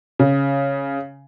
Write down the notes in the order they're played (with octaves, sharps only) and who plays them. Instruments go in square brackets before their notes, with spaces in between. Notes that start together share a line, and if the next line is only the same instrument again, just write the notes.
[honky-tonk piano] C#3